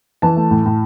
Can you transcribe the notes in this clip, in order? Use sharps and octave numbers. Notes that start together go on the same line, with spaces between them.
E3 A5
A3
A2
A2